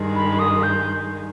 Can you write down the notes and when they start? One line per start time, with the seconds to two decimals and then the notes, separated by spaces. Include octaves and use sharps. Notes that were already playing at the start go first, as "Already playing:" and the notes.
Already playing: G2 D#3 G#3
0.16 B5
0.39 D#6
0.63 G6